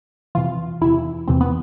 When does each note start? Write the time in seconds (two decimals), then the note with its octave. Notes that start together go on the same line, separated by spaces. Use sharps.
0.35 F2 C3 E3 F4
0.81 E2 C3 E3 E4
1.28 E2 C3 E3 C4
1.41 B3